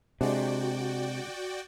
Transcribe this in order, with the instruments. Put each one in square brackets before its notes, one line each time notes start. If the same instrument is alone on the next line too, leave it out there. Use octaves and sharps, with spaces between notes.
[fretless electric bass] C3 [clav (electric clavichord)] G#3 D4 [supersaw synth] F#4 D5 G5